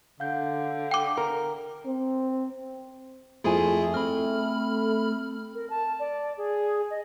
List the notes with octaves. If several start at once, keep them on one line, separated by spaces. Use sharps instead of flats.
D3 F5 F#5 G6
G5 D6
A#4
C4
F2 A3 E4 F4 G#4 E5 G#5
C4 B5 F6
A#4
A5
D5
G#4
D#5